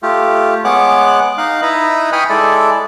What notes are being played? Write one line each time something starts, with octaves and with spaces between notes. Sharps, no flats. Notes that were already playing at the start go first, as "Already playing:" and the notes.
A3 F4 G4
G#3 B3 C#5 F#5 D6 F#6
D#4 F5 F#6
D#4 E4 B4 A#5
G5 G#5 B5 C#6 D#6 F6
G#3 E4 A4 D5